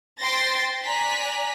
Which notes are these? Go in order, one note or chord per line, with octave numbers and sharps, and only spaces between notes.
C5 G5 C6 A6 A#6
D5 G#5 A#5 F#6 B6